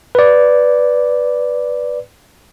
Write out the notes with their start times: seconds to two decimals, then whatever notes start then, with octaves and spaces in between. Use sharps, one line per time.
0.15 B4 D5